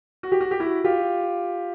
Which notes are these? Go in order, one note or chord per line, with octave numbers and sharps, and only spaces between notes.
F#4
G4
F#4
G4
E4 F#4
F4 G4